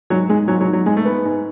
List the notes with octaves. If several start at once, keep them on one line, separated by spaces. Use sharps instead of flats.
G#2 F#3
G#2 G#3
G#2 F#3
F#3
G#2
F#3
G#2 G#3
A3
G#2 B3
G#2